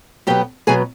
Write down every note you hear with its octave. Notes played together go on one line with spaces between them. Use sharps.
B2 F#3 B3 G4 G5
B2 F#3 B3 G#4 G#5